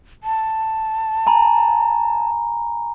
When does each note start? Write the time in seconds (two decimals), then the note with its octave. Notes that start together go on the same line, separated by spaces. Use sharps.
0.24 A5
1.27 G#5 A#5 B5